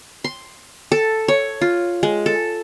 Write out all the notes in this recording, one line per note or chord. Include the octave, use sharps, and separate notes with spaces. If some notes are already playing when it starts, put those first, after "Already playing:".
C6
A4
C#5
F4
G#3
A4